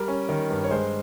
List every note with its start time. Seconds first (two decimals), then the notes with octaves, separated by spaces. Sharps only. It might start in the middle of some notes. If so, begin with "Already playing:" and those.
Already playing: G3 A#4
0.08 C#4
0.29 D#3
0.51 G2
0.64 C#5
0.71 G#3 C5